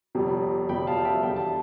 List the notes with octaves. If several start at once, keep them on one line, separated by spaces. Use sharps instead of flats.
G1 F2 C3 G3
G1 F2 C3 G3 G5 B5
F5 A5
E5 G5
E2 D3 G3 G5
A5